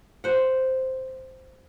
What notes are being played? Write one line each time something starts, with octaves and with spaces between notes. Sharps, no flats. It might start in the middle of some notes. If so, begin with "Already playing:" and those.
C5 F#5